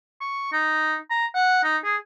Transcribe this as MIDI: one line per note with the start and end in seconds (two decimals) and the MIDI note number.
0.21 0.53 85
0.53 0.96 63
1.10 1.26 82
1.35 1.63 78
1.64 1.78 63
1.84 1.96 68